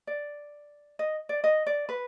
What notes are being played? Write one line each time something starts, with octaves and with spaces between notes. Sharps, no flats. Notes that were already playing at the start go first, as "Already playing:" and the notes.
D5
D#5
D5
D#5
D5
B4